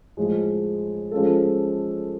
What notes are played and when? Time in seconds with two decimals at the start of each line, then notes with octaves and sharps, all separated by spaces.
0.17 A2 F3 G#3
1.11 F3 G#3 C#4 F4 A4